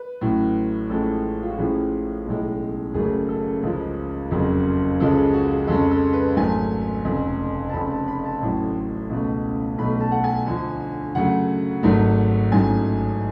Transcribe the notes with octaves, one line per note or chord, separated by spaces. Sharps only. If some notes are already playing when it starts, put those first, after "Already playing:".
Already playing: B4
A1 A2 F#3
A1 A2 F3 G#3 A4
F4
F#4
A1 A2 F3 G#4
B1 A2 G#3
F#1 F#2 C#3 F#3 A3 G#4
A4
C#2 C#3 F3 G#3
F#1 F2 C#3 F#3
C#2 C#3 F3 G#3 A4
G#4
F#4
G#4
F2 C#3 G#3 A4
A4
B4
G#1 G#2 F#3 A3 G#5
F1 F2 C#3
A5
F1 F2 C#3 B5
A5
B5
A5
A1 A2 F#3
C#2 B2 A3
B1 B2 A3 B5
A5
F#5
G#5
D2 D3 F3
F#2 C#3 F#3 A3 F#5
G#1 G#2 F#3 A3
A1 G#2 F#3 A3 G#5